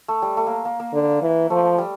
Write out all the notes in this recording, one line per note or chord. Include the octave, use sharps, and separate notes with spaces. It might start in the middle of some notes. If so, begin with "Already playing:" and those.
A3
G3
A3
A#3
A#3
A#3
D3
E3
F3 A3
G3